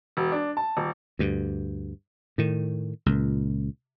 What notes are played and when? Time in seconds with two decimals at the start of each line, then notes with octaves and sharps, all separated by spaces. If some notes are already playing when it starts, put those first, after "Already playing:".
0.17 E1
0.32 D4
0.57 A5
0.77 D#1
1.19 D2 G2
2.38 A2 D#3
3.06 C#2 A#2